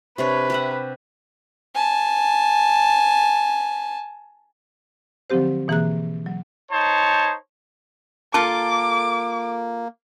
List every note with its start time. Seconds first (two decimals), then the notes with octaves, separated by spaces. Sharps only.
0.18 C3 D4 B4 C#5
0.50 G4 E5 F#5
1.75 G#5 A5
5.30 D3 F3 F#3 C4 G4 C5
5.68 B2 E3 A#3 G#4 A#5 F#6
6.26 F#3
6.72 D#4 C5 C#5 A5
8.34 A#3 F4 A4 A#4 A5 D6